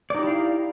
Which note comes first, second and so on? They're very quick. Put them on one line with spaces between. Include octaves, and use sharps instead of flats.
D5 D#4 G4 E4 F5